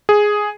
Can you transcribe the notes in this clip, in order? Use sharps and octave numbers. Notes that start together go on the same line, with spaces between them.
G#4